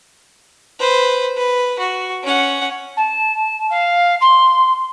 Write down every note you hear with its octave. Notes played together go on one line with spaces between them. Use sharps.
B4 C5
B4
F#4
C#4 F#5
A5
F5
C6